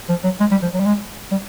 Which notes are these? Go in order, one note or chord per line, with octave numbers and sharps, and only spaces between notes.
F3
F#3
G#3
G3
F3
F#3
G3
G#3
G3